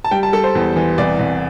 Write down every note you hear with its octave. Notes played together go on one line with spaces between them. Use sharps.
A5
G3 G5
A5
G3 A4
C5
E2
E3
C2 D5
C2